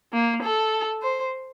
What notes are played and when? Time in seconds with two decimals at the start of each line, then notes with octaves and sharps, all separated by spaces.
0.13 A#3
0.43 A4
1.02 C5